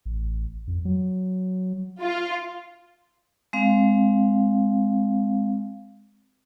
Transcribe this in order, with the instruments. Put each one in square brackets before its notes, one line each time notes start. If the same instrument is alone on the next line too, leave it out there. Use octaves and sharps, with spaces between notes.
[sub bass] A1
F2
F#3
[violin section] F4
[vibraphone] G#3 C4 F5